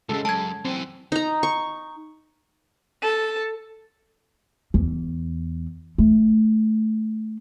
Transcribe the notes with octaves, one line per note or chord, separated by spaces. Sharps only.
E2 G#2 C#3 G#3 A4
F#2 A5 G#6
F#2 E3 C4
D#4 A#5
C#6
A4
E2
A3